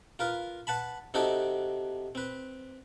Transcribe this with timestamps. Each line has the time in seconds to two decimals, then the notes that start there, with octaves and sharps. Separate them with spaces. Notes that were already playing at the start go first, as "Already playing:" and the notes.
0.19 F4 A#4 B4
0.67 B4 F#5 A5 B5
1.14 C3 C4 D#4 F#4 G4 A4
2.15 C4 B4